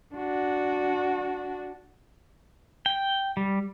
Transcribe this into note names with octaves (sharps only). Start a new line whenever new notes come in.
D4 F#4
G5
G3